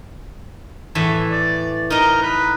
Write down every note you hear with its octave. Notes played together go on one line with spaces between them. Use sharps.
A2 E3 E5
D5
D#4 A#4 D#5
B4